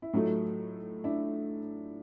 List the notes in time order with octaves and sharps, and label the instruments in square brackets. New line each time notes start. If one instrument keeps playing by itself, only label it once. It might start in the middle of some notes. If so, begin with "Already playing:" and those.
[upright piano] E4
A2 F#3 A3 D#4 F4
D4 E4